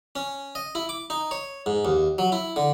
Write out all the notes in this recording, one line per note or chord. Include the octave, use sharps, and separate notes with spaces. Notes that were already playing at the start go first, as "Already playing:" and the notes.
C#4
D#5
E4
D6
D#4
C#5
G#2
D#2
F#3
E4
D3